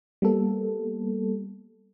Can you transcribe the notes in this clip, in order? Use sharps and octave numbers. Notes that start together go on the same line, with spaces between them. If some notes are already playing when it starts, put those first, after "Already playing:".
G3 A#3 B3 A4